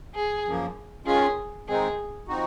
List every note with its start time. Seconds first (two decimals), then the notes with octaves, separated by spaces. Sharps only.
0.14 G#4
0.45 F#2 F3 A#3
1.05 D#3 G#3 C#4 F4 G#4
1.67 D#3 G#3 C4 D#4 G#4
2.28 F3 C4 D#4 F#4